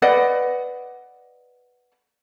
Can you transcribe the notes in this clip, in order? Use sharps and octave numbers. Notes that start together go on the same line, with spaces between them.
B4 D5 D#5 F#5